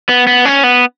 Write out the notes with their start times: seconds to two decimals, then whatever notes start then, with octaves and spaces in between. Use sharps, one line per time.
0.09 B3
0.27 B3
0.45 C#4
0.63 B3